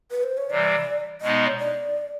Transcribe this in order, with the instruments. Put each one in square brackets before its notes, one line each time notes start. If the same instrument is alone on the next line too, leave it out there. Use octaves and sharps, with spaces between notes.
[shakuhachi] B4
C5
C#5
[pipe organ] C3 E3 G3 [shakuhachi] D5
[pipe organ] B2 G#3 B3 D#4 [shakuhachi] D#5
[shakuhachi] C#5
D5